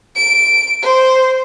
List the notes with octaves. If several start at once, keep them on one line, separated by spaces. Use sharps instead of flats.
D7
C5